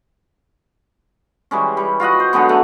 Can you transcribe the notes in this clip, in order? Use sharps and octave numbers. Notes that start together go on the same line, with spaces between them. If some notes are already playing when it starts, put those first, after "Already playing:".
E3 G3 G#3 C#4
G3
F4 F#4 D#5 F#5
C5
D3 F#3 G#3 B3
A3